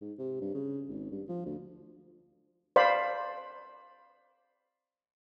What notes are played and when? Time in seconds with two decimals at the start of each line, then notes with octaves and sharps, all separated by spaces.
0.01 G#2
0.18 C3
0.41 G2
0.54 C#3
0.89 G#1
1.12 G2
1.28 F3
1.46 D2
2.76 C5 D5 F5 B5